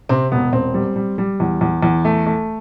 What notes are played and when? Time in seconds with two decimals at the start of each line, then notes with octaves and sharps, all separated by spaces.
0.09 C3 C4
0.32 E1 B3
0.52 E1 C4
0.74 G3
0.96 G3
1.18 G3
1.40 E2
1.61 E2
1.83 E2
2.05 A3
2.27 A3